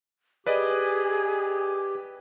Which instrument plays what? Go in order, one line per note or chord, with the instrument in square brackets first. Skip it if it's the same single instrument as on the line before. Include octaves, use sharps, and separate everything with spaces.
[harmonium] G4 [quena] G#4 [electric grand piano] B4 D5 D#5